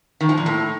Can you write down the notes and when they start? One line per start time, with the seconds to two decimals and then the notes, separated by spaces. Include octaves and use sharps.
0.21 D#3
0.29 F3
0.38 A#2
0.46 A2